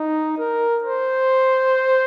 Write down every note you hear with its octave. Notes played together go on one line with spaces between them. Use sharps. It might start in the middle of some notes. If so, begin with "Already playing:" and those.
Already playing: D#4
A#4
C5